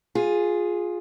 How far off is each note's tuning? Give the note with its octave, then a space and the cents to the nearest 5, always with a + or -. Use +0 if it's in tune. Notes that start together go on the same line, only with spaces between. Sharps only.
F4 +15 G#4 +0